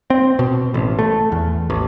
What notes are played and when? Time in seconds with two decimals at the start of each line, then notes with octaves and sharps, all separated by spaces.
0.10 C4
0.39 B2
0.74 A1
0.99 A3
1.32 E2
1.70 A1